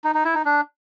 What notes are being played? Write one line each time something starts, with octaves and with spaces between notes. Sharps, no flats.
D#4
D#4
E4
D#4
D4